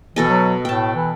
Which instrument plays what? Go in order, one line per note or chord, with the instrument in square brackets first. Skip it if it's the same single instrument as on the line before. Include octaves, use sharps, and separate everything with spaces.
[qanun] B2 A4 D#5 [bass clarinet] E3
[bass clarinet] F#3
[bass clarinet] A2 [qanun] G5 A5
[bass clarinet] E3